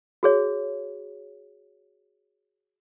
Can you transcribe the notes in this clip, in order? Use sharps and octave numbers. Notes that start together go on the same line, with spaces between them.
F#4 G#4 C#5